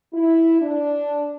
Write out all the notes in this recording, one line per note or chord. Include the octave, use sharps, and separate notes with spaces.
E4
D4